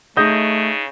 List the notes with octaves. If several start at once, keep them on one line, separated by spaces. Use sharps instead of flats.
C#3 A3 D#4 G#4 D#5 D#6 G6 A#6